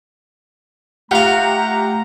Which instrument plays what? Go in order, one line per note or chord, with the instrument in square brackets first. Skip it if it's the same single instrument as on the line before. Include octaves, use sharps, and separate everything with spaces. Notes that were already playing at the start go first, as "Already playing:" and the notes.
[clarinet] A3 [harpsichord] F4 F5 [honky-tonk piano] G4 F#5 [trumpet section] A#5